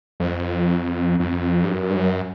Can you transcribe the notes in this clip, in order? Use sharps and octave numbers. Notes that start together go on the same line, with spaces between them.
F2
F2
G2
F#2
G2
F#2